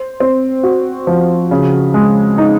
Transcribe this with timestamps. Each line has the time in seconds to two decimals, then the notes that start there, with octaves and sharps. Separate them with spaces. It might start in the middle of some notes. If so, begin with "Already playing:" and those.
Already playing: C5
0.20 C4
0.63 F#4
1.07 F3
1.51 C#3
1.94 G#3
2.38 D#4